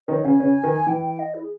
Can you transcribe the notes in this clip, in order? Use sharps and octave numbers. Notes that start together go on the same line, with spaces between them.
D#3 D#4 C#5
C#3 C#4 G#5
C#3 C#4
D#3
E3 G5
G5
D#5
E4
G#4